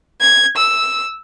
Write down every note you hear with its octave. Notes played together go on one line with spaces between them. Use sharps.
G#6
E6